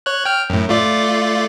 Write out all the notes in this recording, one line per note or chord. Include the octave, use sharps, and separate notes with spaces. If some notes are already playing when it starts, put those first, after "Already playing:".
C#5 F#6
G5 F6
F#2 A2
A3 F4 D5